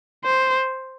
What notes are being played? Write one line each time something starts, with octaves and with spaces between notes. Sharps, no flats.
C5